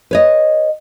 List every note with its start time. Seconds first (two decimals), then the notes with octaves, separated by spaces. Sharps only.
0.11 B4 C#5 D#5